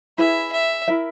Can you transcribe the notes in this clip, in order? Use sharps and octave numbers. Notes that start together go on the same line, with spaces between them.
E4 G#4 B4 E5
E5
E4 A#4 E5